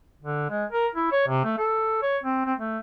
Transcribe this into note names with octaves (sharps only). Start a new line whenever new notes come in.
D3
G#3
A#4
E4
C#5
C3
A3
A4
C#5
C4
C4
A3